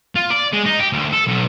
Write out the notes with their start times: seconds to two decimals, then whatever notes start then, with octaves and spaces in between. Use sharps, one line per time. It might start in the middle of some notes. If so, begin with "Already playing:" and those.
0.15 F4
0.30 D5
0.53 G#3
0.66 D#4
0.80 G4
0.93 D2
1.13 A4
1.27 B1